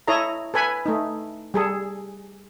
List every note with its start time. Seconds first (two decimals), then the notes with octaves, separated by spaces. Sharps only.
0.08 E4 A4 C#5 D#5 A#5
0.54 A4 B4 G#5 B5
0.86 A3 D#4
1.54 G3 G#4 A4